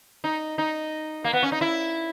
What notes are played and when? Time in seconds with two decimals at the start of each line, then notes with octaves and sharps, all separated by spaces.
0.24 D#4
0.58 D#4
1.24 A#3
1.33 B3
1.43 C#4
1.52 D#4
1.61 E4